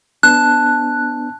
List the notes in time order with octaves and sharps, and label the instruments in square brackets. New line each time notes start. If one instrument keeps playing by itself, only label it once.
[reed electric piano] B3 D4 [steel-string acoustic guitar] A5 [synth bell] F#6